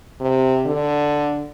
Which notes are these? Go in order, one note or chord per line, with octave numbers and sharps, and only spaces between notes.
C3
D3